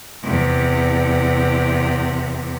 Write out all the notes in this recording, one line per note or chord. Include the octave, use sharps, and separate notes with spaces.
E2 C3